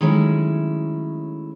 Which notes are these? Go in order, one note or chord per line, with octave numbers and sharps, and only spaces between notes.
D#3 F#3 G#3 A3 C#4 E4